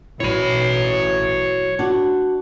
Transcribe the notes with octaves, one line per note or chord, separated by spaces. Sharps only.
A1 F#3 E4 C#5 B5
D4 F#4